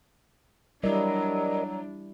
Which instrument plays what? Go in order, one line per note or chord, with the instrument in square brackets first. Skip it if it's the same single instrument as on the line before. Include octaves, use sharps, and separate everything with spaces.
[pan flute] F#3 [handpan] G3 E4 [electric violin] D4 [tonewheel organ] A#4 D5 D#5